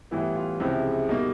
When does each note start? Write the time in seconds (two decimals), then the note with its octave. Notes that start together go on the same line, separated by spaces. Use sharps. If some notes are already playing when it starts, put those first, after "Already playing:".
0.11 A2 E3 G3 B3 E4
0.36 F4
0.60 C#2 C3 F3 G#3 E4
1.09 B2 G3 A#3 D#4